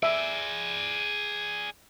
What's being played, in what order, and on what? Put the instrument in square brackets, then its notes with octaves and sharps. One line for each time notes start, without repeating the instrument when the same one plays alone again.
[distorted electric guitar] G#4 D5 [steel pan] E5